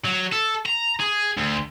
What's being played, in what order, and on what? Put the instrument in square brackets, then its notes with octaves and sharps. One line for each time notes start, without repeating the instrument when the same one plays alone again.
[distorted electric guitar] F#3
A4
A#5
G#4
D2